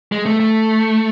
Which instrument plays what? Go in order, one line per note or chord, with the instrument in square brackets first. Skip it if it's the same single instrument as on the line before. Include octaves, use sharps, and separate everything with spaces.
[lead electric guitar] G#3
A3
A3